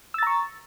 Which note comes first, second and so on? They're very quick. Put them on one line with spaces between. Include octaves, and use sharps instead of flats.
E6 A6 A#5 C#6